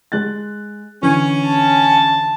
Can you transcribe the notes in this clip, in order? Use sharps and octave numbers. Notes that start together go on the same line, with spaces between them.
G#3 F#6 A6
D3 E3 C#4
A5